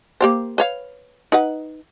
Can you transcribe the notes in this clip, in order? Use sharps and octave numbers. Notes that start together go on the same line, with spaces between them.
A#3 G4 C5
B4 C#5 F5
D#4 B4 F#5